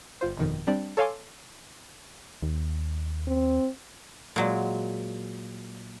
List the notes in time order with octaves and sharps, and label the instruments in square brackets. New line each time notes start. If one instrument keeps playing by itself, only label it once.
[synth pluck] G1 F4 C5
G1 F2 B2 D#3
G3 C4 D4 D5
A4 C#5 F5 G#5 C6 D6
[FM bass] D#2
[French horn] C4
[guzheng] A#2 F#3 G#3